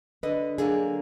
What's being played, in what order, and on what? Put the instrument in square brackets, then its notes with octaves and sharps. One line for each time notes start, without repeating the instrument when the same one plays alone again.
[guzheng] D3 [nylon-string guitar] B4 D#5
[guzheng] D3 F#3 A#3 [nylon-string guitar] G#4